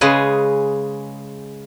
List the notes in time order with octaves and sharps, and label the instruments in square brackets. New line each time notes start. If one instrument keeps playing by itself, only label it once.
[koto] C#3 G#3 G#4 B4